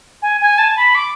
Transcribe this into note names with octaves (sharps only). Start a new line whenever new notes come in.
G#5
G#5
A5
B5
D6